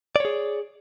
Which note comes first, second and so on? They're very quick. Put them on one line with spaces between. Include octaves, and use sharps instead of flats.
D5 C#5 G#4